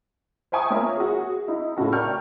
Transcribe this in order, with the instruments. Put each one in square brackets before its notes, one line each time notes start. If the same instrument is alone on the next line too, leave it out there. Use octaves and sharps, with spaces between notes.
[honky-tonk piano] C5 E5 G5 G#5 C#6 D#6
A#3 F4 A#4 C#5 E5
F#4 G#4
D#4 E4
A2 C#3 F#4 A4
A#4 D5 G5 C#6 F6 G6